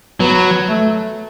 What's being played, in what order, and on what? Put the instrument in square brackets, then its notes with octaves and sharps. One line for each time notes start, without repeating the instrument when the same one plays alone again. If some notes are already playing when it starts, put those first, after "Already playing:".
[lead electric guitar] F#3 [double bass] B3
[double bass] A3